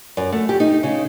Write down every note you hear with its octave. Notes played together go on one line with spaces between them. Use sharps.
F#2
A3
G4
D#4
C#3